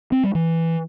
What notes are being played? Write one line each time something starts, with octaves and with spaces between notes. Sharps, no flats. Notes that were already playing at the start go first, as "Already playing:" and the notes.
C4
G3
E3